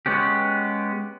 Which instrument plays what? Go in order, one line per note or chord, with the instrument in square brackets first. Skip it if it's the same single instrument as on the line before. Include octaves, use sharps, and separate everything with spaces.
[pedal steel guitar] G#3 B3 C#4 G4